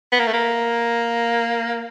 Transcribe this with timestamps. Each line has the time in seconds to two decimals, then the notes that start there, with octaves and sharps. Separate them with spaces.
0.12 B3
0.20 A#3
0.27 A3
0.34 A#3